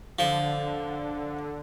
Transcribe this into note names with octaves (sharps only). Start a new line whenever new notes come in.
D3 F3